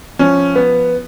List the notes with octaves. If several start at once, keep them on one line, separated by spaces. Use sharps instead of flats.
F3 C#4
B3